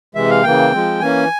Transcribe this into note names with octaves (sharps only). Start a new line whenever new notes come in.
C3 E3 G#3 E5
F5
C#3 E3 A#3 G5
F3 G#3 C4
E3 A#3 C#4 G#5